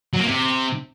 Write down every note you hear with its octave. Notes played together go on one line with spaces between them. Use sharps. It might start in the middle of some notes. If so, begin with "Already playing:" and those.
F#3
A#3
C3